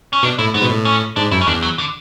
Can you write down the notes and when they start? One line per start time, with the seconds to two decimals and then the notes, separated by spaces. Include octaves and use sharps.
0.13 C#4
0.23 B2 D4
0.39 A2 E4
0.54 G#2 B3
0.62 B2
0.69 A2
0.85 C#4
1.16 G#2 D4
1.31 F#2 E4
1.41 C#4
1.47 E2 D4
1.62 F#3
1.78 D3